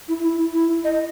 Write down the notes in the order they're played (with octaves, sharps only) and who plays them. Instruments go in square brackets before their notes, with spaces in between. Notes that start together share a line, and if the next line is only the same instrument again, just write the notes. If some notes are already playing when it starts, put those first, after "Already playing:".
[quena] E4
E4
E4
D#5